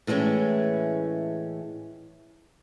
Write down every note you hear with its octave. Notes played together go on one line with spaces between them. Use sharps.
A2 E3 G#3 A3 C#4